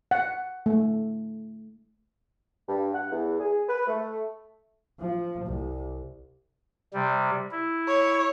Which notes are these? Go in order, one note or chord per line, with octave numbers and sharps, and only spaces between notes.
F#5
A3
G2
F#5
E2
G#4
B4
A3
F3
C2
C3 G3
E4
C#5